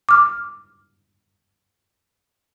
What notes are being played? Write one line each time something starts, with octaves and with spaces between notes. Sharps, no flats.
D6 F6